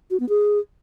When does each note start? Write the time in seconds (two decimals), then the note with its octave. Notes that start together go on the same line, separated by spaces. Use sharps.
0.11 F#4
0.20 B3
0.29 G#4